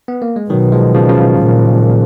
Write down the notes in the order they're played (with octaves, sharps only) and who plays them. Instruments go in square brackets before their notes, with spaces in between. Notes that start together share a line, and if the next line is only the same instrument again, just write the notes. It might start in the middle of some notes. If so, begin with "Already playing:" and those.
[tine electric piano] B3
A#3
G#3
[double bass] B2 [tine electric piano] D#3 F#3
[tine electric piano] F3 G#3
C#3 F3
C#3 F3
[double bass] A#2